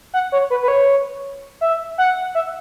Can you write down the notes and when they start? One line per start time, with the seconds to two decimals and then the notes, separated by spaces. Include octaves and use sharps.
0.14 F#5
0.32 C#5
0.50 B4
0.63 B4
0.68 C#5
1.61 E5
1.98 F#5
2.35 E5